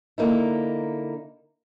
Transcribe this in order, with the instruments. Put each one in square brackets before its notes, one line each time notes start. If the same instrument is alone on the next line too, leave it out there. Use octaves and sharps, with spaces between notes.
[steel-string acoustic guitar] D3 A#3 D#4 E4